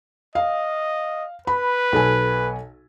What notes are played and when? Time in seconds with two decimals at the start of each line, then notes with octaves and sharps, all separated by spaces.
0.35 D#5 F5
1.47 B4 B5
1.92 B1 A4 G#5